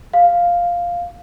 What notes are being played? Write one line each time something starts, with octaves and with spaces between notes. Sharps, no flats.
F5